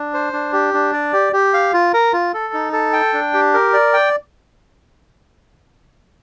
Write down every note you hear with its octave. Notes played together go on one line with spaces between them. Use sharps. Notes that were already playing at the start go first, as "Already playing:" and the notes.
Already playing: D4
C5
D4
G4
D4
D5
G4
G4
F5
F4
A#4
F4
A4
D#4
A4
G5
D4
G4
A#4
D5
G5